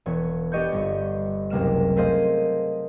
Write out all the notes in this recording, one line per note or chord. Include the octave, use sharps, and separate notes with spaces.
E1 B3 C#5
B3 D4 G4 D#5 C#6 G6
G1
F#1 C#2 C3 A#3 F6 E7
A3 A#3 G#4 C5 D#5 F5